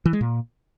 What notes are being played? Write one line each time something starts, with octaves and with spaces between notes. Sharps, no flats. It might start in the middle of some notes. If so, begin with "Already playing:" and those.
E3
G#3
A#2